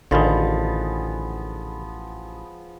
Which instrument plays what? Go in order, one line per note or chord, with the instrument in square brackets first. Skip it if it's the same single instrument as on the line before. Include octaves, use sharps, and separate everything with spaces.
[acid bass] A1 [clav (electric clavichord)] D3 D#3 [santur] F3 B3 G#4